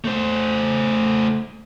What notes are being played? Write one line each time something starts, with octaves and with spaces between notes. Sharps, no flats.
A3 C5